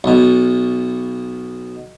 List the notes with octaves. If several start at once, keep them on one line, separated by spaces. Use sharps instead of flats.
B1 B2